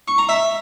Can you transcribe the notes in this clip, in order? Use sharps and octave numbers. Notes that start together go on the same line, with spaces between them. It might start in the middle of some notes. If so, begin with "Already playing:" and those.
C#6
A#5
E5